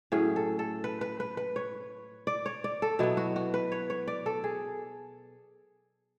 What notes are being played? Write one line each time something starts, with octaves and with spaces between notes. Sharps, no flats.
A2 F#3 C#4 G#4
A4
A4
B4
B4
B4
B4
C#5
D5
C#5
D5
A4
B2 F#3 B3 E4
F#4
F#4
B4
C#5
C#5
D5
A4
G#4